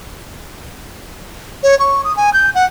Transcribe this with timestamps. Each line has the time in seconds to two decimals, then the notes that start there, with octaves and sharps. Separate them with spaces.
1.63 C#5
1.79 C#6
2.05 D#6
2.17 G#5
2.33 G6
2.55 F#5